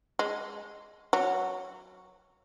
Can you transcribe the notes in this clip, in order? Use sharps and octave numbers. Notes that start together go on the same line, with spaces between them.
G#3
F#3